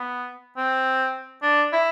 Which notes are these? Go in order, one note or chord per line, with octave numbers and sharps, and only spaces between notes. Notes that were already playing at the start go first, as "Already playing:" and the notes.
Already playing: B3
C4
D4
E4